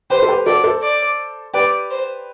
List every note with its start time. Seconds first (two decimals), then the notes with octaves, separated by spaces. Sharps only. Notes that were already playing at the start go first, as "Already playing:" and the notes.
0.10 G4 B4 C5
0.23 A4
0.28 G4 B4
0.46 F#4 A4 D5
0.64 A4 C5
0.83 D5
1.54 G4 B4 D5
1.90 C5